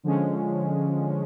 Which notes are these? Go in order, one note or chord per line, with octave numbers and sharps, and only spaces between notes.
D3 F3 G#3 C#4